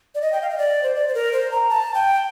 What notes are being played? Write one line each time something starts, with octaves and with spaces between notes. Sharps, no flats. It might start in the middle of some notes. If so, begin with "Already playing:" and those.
D5
D#5
G5
F5
D#5
D5
C5
D5
C5
A#4
C5
A#5
A5
G5